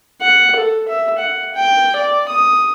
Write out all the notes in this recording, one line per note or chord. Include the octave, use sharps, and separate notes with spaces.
F#5
A4
E5
F#5
G5
D5
D#6